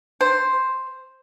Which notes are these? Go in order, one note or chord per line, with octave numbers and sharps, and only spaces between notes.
C5